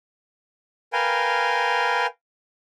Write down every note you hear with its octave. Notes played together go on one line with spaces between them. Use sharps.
A#4 B4 F5 G5 G#5